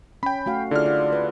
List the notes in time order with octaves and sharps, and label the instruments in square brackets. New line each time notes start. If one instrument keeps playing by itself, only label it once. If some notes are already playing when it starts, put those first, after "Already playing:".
[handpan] C#4 [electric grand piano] G5 B5
[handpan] A3 F#4 F5
[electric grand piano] D3 F6 [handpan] E4 F4 G#4 [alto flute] D5
[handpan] F4
B4